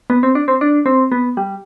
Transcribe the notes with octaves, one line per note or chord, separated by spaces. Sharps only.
B3
C4
D4
C4
D4
C4
B3
G3